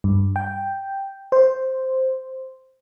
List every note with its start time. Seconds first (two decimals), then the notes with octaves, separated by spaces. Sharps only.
0.04 G2
0.36 G5
1.32 C5